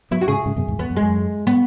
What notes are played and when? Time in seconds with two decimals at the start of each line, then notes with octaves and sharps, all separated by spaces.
0.11 F#3 B3 E4
0.21 F#4
0.28 G#2 C#3 G#4
0.46 G#2 C#3
0.56 F#2 B2
0.68 E2 G#2
0.79 E2 B3
0.90 F#2
0.96 G#3
1.02 F#2
1.47 B3